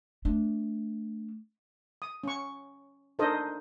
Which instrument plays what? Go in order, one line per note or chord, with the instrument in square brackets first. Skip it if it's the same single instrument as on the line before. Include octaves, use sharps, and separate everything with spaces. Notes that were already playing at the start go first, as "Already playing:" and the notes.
[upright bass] A3 D4
[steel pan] D#6
C#4 C#6
D4 D#4 A4 A#4 C5 D#5